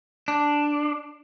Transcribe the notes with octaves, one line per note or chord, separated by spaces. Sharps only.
D4